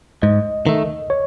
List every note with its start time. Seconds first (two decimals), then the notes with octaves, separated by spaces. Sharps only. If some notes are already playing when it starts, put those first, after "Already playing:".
0.22 G#2 D#5
0.67 D#3 A3
1.10 C#5